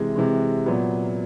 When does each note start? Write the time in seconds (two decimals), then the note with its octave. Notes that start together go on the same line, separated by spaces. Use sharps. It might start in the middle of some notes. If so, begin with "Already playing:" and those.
Already playing: C3 E3 G#3
0.15 C3 E3 G#3
0.66 A#2 F#3 B3